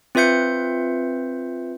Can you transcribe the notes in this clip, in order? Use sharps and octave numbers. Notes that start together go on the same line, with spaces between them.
C4 F4 B4 E5 G6 C#7